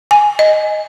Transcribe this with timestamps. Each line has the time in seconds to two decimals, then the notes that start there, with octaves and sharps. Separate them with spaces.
0.11 G#5
0.39 D#5